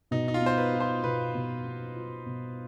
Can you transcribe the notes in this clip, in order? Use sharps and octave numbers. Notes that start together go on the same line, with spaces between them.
B2 D#4
D#4
F4
B3 C5
B4
F4
C5
B2 B4
B2
B3
F4
B2